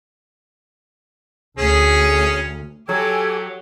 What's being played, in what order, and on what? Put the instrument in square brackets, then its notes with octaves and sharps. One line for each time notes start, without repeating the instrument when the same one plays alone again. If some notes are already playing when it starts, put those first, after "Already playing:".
[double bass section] D2 [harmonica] C#4 G#4
[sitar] F#3 [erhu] G4 [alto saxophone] A4 [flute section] G#5 E6 G#6